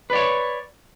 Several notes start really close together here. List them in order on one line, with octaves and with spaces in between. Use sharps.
B4 D5 C#5